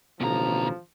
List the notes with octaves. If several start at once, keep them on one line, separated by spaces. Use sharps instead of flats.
A1 D#2 B2 D3 F3 A#5